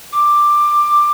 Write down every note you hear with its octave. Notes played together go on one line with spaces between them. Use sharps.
D6